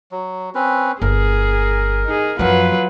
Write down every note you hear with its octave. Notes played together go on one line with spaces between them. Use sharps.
F#3
C4 C#4 B4
G1 G#4 A#4
D#4 G#4
F#2 F3 F#3 F4 B4